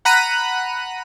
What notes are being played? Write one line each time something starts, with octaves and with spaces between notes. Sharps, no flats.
F#5 A#5 B5 F#6 D#7